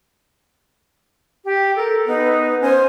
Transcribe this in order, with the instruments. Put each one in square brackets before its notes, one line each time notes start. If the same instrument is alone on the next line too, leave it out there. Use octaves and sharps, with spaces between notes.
[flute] G4
[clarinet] A4 [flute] A#4
[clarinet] B3 [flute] D#4 [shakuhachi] B4
[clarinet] C#4 [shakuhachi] C5 [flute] G#5